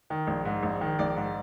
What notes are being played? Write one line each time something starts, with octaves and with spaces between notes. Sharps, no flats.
D#3
A#1
G#2
A#1
D#3
A#1 D5
G#2